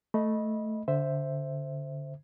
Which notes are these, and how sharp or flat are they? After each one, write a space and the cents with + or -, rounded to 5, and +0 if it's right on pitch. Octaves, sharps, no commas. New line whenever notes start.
A3 +0 D#5 +0 B5 -15
D3 -20 C5 +0 E5 +0